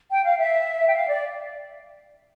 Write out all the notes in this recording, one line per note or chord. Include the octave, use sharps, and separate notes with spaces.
G5
F5
E5
G5
F5
D5